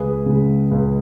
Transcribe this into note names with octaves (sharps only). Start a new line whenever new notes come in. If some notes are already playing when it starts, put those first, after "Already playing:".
Already playing: C#2 G#4 B4
C#3 G#3
C#2